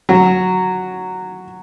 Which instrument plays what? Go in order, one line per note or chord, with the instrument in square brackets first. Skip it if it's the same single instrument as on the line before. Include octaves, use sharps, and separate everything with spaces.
[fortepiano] F#3